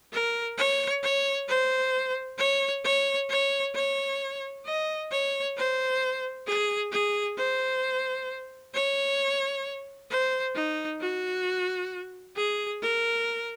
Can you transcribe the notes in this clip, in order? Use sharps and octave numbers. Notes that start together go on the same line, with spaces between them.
A#4
C#5
C#5
C5
C#5
C#5
C#5
C#5
D#5
C#5
C5
G#4
G#4
C5
C#5
C5
D#4
F#4
G#4
A#4